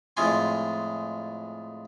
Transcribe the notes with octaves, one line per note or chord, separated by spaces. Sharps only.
F2 A2 G#3 F4 G#5 C6